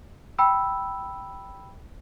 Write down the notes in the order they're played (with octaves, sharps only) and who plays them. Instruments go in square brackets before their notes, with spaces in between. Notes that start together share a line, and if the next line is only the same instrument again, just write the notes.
[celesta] G5 B5 E6